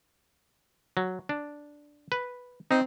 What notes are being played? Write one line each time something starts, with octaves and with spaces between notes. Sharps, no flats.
F#3
D4
B4
C4 D#4